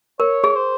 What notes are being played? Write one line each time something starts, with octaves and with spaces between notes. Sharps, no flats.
A#4 C#5
G#4
C5